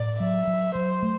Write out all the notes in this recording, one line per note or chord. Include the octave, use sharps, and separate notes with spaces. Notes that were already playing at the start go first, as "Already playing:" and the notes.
Already playing: A2 D5
F#3 E5
F#3
F#3 C5
A3